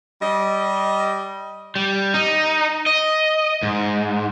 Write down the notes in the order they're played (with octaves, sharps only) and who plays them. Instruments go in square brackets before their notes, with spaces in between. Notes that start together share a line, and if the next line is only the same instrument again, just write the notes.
[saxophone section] G3 D#5
[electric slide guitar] G3
D#4
D#5
G#2